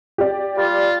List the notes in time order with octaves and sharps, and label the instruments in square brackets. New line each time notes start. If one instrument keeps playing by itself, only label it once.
[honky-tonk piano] G4 D5
[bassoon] G3 [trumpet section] F4